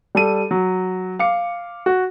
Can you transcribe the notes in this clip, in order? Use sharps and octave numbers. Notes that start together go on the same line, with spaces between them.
G3 A4 D#7
F#3
F5 D6 C#7
F#4